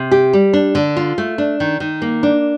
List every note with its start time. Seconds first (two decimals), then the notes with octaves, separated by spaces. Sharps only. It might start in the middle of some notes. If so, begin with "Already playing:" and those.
Already playing: C3
0.11 G4
0.33 G3
0.53 D4
0.75 D3
0.97 F4
1.18 A3
1.38 D4
1.60 D#3
1.80 D#3
2.02 A#3
2.23 D4